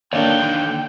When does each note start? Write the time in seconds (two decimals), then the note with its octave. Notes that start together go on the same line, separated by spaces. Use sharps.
0.13 D#2 D3 A#3 D4 C#5 G5